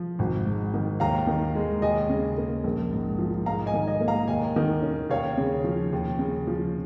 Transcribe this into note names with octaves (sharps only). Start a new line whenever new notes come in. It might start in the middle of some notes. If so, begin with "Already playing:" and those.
Already playing: F3
G#1
G#2
D#3
D#2 F5 A#5
D#3
G#3
D#2 D#5 G#5
C#3
A#3
A#1
G#2
F3
G#2 F5 A#5
D#5 G#5
D#3
D#5 G#5
A#3
F5 A#5
D#2 D#5 G#5
D#3
C#4
D#2 C#5 F5
C#3
F3
D#2
C#3
F3